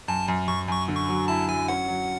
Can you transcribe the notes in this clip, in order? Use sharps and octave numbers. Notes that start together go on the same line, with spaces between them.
F#2 A5
F#2
F#2 C#6
F#2 C#6
D3
C#6
F#3
E4 A5
F#3 G#5
C#4 F#5
F#3